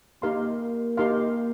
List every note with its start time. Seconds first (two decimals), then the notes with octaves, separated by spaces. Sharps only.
0.22 A#3 D#4 G4 A#4 F5 C6
0.97 D#4 G4 A#4 F5 C6